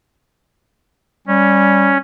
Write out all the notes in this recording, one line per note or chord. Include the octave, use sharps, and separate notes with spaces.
G3 C#4